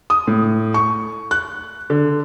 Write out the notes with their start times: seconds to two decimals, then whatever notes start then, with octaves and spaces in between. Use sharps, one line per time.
0.10 D#6
0.27 A2
0.74 C#6
1.31 F#6
1.90 D3